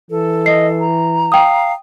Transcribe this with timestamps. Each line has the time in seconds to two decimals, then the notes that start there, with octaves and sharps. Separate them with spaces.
0.10 E3 A4
0.46 D#5 C7
0.80 A#5
1.32 F5 G5 D#6